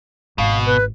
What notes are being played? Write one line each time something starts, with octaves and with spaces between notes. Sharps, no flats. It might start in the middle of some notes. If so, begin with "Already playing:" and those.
G#1 B2 F5
B4